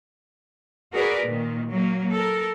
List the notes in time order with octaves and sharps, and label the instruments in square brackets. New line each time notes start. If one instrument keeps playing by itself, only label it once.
[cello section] F#4 G#4 A#4 B4 D5
A#2 D#3
F#3 A#3
A4 A#4